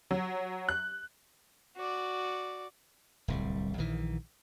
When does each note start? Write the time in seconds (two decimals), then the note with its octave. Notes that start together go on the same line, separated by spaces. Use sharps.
0.11 F#3
0.69 F#6
1.76 F#4 D5
3.28 D1 C2 G3
3.78 A#1 D#3 E3